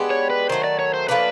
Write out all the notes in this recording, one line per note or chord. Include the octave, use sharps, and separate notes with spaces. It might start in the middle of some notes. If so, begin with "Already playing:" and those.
Already playing: G#3 B3 D4 G4
C#5
B4
D#3 F#3 A3 C5
D5
C#5
C5
A2 F3 A#3 D4 B4